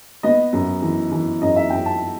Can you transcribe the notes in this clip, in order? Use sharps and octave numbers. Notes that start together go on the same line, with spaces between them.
B3 D#5
F#2
E3
E3
F#2 D#5
E5
F#2 G5
A5